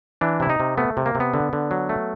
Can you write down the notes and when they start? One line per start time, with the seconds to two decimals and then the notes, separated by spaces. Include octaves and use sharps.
0.21 E3 D4
0.40 C3 E4
0.49 D#4
0.60 C3
0.78 A3 B3
0.97 C3
1.06 A#3
1.15 C3
1.20 B3
1.34 D3
1.53 D3
1.71 F#3
1.89 A3